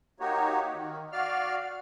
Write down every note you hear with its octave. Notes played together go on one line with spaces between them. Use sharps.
A#3 D#4 F#4 G4 C#5
D#3
F#4 D5 F5 F6